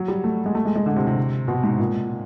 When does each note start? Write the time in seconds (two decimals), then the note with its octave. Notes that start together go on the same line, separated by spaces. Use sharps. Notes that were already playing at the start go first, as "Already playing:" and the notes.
Already playing: F#3
0.08 G3
0.24 A3
0.46 G#3
0.55 A3
0.65 G#3
0.75 G#3
0.86 D3
0.96 C3
1.07 C3
1.48 B2
1.64 G#2
1.79 A#2